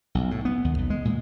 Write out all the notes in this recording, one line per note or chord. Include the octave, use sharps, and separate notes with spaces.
B1
A2
B3
D#2
B1
G#3
A#2